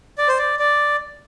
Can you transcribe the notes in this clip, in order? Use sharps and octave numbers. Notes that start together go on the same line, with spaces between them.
D5
C5
D5
D5